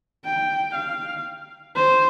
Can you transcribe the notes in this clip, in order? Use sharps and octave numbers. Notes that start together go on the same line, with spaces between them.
G5
F5
C5